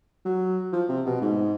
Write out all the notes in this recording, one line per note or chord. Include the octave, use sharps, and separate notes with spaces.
F#3
F3
C3
B2
G#2